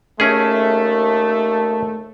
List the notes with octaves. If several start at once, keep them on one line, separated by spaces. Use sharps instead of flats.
D#2 A3 C#4 G#4